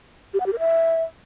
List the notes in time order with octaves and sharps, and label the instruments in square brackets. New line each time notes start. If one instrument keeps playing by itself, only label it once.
[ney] G4
F#5
G4
A#4
E5